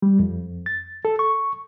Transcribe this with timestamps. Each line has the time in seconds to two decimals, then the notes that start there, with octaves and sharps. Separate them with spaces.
0.02 G3
0.19 F2
0.66 A6
1.05 A4
1.19 C#6